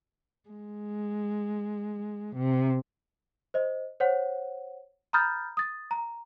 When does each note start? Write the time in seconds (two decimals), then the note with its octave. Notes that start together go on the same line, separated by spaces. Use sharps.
0.49 G#3
2.36 C3
3.54 C5 D#5
4.00 C5 C#5 F#5
5.13 A#5 B5 D#6 F6 G6 A6
5.57 D#6 A6
5.91 A#5